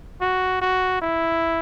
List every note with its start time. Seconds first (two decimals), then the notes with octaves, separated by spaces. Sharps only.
0.21 F#4
0.62 F#4
1.02 E4